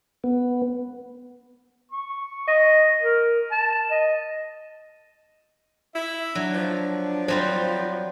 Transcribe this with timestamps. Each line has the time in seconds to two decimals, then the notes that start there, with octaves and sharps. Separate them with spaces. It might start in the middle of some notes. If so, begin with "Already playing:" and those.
0.24 B3
1.91 C#6
2.48 D#5
3.01 A#4
3.52 A5
3.91 D#5
5.95 E4 E5
6.35 F#3 D4
6.54 F3
7.28 F#3 G3 F4 C5